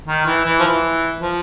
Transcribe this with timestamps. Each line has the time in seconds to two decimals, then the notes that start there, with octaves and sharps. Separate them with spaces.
0.07 D#3
0.26 E3
0.45 E3
0.59 F3
0.63 E3
1.20 F3